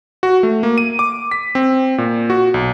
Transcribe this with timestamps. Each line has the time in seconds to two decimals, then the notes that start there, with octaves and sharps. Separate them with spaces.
0.23 F#4
0.43 A3
0.63 A#3
0.78 D#7
0.99 D6
1.31 B6
1.55 C4
1.98 A#2
2.30 F#4
2.54 B1